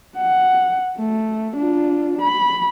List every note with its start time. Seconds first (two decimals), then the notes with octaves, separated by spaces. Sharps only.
0.17 F#5
0.97 A3
1.56 D4 F4
2.22 B5